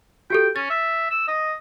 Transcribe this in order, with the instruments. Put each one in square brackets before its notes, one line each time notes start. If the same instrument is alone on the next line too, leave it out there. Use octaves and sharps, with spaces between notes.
[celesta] F#4 G4 A4 [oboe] G5
[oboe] C#4 [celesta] A6
[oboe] E5
E6
D#5